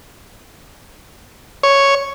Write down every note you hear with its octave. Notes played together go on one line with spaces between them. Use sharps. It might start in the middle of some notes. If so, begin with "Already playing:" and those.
C#5